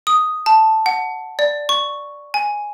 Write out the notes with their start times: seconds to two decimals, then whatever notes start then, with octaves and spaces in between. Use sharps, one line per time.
0.07 D#6
0.46 A5
0.86 F#5
1.39 D5
1.69 C#6
2.34 G#5